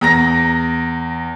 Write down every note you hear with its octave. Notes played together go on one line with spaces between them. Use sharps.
E2 A#5 A#6